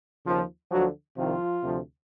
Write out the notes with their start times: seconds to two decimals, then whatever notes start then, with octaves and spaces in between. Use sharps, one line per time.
0.26 D#2 C#3 F3
0.71 D2 D3 F3 F#3 F#4
1.17 C2 C3 D#3 F3 F4
1.63 D2 C3 F3